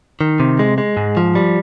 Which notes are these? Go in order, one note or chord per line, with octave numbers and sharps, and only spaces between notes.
D#3
C3
G#3
G#3
G#2
F3
G3